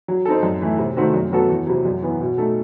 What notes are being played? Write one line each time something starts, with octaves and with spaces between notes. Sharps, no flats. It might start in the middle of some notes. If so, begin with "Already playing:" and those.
F#3
C4 D#4 A4
F#2
E3 A3 E4
C3
D#3 A3 C4 F#4
F#2
F#3 B3 F#4 A4
E2
C3 F#3
F#2
E3 B3
B2
A3 D#4 A4